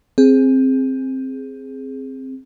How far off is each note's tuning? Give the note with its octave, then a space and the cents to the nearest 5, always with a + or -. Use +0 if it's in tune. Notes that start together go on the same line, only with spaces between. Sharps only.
C4 +10 G#4 +0